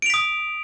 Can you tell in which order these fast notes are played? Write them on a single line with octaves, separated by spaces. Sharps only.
D7 F7 B6 D#6